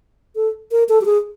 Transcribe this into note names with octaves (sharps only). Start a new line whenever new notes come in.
A4
A#4
A4
G4
G#4